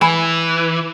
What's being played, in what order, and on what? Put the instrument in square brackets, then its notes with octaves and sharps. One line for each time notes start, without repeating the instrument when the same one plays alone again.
[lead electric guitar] E3 [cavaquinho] G#5 B5